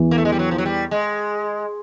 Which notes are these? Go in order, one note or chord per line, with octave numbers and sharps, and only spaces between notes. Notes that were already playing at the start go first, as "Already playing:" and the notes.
Already playing: E2 E3
A#3
A3
G#3
G3
F#3
F3
F#3
G3
G#3